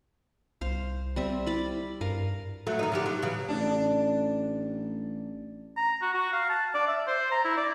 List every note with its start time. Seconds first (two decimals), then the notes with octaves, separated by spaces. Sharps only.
0.61 C2 C5 F5
1.16 G3 C4 E5
1.46 E4 D5 B5
2.01 G2 A#4 F5
2.67 F#3 A3
2.79 D#3 D#4
2.92 D3 F3 G4
3.06 F#3
3.22 C#3 E3
3.48 A1 D4
5.77 A#5
6.02 F#4
6.14 F#4
6.33 F5
6.50 A5
6.74 D5
6.87 E5
7.07 C5
7.31 A#5
7.45 E4
7.57 D5